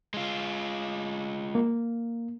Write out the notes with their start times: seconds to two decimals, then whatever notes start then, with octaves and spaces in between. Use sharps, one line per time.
0.14 G#3 F4
1.55 A#3